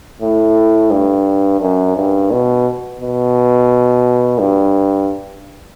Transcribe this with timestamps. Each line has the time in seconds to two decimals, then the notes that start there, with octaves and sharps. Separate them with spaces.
0.22 A2
0.91 G2
1.61 F#2
1.97 G2
2.31 B2
3.01 B2
4.40 G2